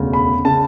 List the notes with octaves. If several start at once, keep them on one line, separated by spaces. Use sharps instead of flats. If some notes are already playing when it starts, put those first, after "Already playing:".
Already playing: E1 D2 C#3
B5
C#3 A5